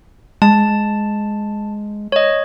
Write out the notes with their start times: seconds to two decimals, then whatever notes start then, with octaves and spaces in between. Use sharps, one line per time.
0.42 G#3 A5
2.12 C#5 D#5